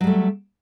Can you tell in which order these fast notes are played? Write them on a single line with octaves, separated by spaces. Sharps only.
F#3 G3 A3